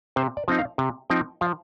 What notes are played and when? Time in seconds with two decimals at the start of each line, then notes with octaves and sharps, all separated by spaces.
0.16 C3 C5
0.37 D5
0.48 F3 C4 D#4
0.59 F5
0.78 C3
1.10 F3 C4 D#4 G5
1.41 F3 F5